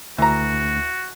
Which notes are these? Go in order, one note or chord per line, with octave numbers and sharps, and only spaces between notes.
D2 E3 F#4 A#5